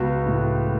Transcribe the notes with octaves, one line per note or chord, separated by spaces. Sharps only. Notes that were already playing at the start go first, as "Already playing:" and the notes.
Already playing: C#2 B3 F#4
A2